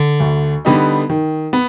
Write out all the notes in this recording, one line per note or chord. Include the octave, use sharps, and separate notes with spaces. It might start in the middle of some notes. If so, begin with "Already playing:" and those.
Already playing: D3
D2
D3 G3 B3 D#4
D#3
B3